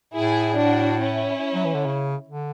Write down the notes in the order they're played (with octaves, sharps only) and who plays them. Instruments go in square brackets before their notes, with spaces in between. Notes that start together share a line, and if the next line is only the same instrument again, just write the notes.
[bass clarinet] A2 [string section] E4 G#4
[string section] D4 F#4
C#4 E4
[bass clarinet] F#3
E3
D3
C#3
D3